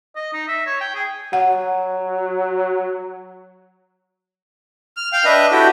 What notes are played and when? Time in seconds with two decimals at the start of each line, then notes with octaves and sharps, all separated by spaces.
0.16 D#5
0.33 D#4
0.48 E5
0.67 C#5
0.81 G5
0.95 G#4
1.33 F#3 F#5
4.97 F6
5.13 F5 G5 F6
5.25 D4 B4 D#5 E5
5.52 E4 F#4 G4 A4 G5